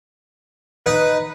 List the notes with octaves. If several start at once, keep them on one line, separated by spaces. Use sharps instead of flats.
D#4 B4